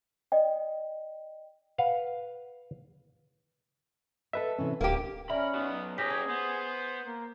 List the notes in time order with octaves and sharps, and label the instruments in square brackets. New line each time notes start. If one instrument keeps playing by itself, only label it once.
[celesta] D5 D#5 G5
[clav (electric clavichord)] B4 F5 F#5
[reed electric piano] A4 B4 E5 [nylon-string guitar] D#5 A5
[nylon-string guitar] C3 E3 C#4
[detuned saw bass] D1 [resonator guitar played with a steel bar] A#3 G4 [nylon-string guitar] F5
[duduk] C#4 [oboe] A#4 [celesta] D5 E5 [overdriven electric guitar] B5
[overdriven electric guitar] B2 F#3 [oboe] B3
[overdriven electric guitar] A#3 C#4 [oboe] G4 [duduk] G#4 [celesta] A#6 B6
[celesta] G#6
[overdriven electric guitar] B3 [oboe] C5
[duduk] A#3